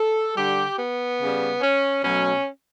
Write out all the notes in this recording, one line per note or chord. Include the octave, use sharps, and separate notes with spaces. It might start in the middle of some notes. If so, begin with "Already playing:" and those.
Already playing: A4
D3 G3 G4
B3
C#3 G3
C#4
B2 F#3 A3 C#4